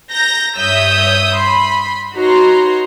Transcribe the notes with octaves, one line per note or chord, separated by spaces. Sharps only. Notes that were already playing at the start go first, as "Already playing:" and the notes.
A#5 G6 A#6
G2 C#5 E5 D#6 E6 G6
B5 C6
D#4 F#4 B4 C#5 A#5 C6